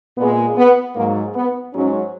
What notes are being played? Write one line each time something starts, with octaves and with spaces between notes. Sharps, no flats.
A#2 G#3 B3
B3
G#2 F#3 A#3
B3
G#2 F#3 C#4